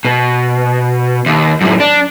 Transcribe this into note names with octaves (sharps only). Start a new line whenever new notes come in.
B2
D#2
F#2 A2
D4